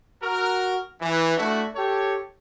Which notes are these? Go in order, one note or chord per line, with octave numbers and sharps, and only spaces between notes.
F#4 A#4
E3
A3 D4 E4 F#4
G4 A4 C#5